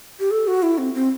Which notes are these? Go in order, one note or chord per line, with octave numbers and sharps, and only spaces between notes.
G4
A4
F#4
E4
C4
C4